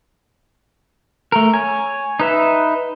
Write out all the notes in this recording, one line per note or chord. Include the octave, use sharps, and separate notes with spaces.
A3 A#4
C#5 G#5
D#4 B4 E5